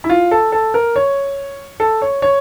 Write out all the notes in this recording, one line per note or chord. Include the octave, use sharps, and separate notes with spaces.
E4
F4
A4
A4
A#4
C#5
A4
C#5
C#5